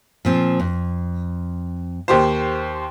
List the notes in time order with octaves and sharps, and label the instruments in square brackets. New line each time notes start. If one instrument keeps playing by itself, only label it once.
[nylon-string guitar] A#2 F3 C4
F2
[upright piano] D#2 G4 C5